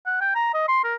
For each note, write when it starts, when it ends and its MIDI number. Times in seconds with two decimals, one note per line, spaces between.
0.06 0.20 78
0.21 0.34 79
0.35 0.52 82
0.54 0.66 75
0.68 0.83 84
0.84 0.94 70